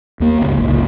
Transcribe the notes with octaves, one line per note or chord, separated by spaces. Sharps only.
D#2 A#3
F#1 C#2 G#2
G1 C#2 A#2